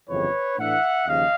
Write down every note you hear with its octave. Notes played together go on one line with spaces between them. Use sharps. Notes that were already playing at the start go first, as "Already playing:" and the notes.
G1 F2 C#3 E3 B4 C#5
A2 E3 A3 D4 E5 F#5
D#2 C#3 F3 D#5 F5